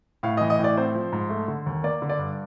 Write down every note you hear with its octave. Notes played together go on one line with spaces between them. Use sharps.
A2 F5
E3 D#5
D#5
A2
D5
C4 C5
F3
G#2
A3
D3
D#2
A#3 D5
D3
D5
G2